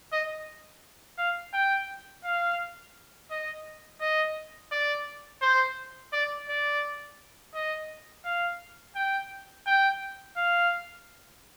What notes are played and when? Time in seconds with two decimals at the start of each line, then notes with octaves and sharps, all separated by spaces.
0.13 D#5
1.18 F5
1.54 G5
2.24 F5
3.30 D#5
4.01 D#5
4.72 D5
5.42 C5
6.13 D5
6.49 D5
7.54 D#5
8.25 F5
8.96 G5
9.67 G5
10.37 F5